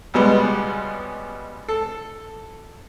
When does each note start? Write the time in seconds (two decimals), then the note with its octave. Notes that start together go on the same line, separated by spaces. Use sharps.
0.14 C#2 B2 G3 G#3 B3
1.69 A4